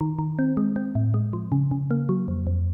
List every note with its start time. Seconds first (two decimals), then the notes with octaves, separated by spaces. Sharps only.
0.01 D#3
0.19 D#3
0.39 C4
0.57 G#3
0.76 C4
0.95 A2
1.14 G#3
1.33 F3
1.52 C#3
1.71 C#3
1.91 A#3
2.09 F#3
2.28 F2
2.47 F2